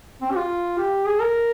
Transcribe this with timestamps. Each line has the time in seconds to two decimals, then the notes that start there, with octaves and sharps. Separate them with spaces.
0.22 C4
0.31 G4
0.36 F4
0.78 G4
1.07 G#4
1.21 A#4